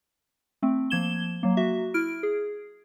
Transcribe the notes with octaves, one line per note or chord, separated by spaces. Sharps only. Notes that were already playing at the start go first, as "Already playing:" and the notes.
A3 C4
F3 A#3 G#6 E7 G7
F#3 A#3
F#4 E5
E4 F6 D7
G#4